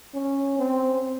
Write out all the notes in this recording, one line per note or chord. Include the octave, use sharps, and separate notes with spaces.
C#4
C4